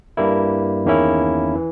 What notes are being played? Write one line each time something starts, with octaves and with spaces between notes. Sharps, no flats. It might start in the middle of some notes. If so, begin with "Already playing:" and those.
G2 G3 A#3 E4
E2 D#3 A#3 C#4 E4
E3